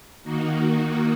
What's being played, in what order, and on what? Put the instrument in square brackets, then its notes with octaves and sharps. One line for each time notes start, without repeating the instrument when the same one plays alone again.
[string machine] D#3 A#3 D#4 F#4